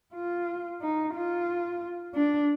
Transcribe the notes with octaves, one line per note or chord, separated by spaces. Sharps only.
F4
D#4
F4
D4